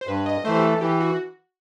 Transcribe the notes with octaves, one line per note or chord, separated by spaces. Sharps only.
C5
G2 B4
D#5
E3 A3 C5
G4
A4
E3 G4
F#4